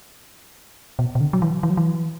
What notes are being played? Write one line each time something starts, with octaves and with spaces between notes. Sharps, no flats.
B2
B2
D3
F#3
E3
E3
F#3
E3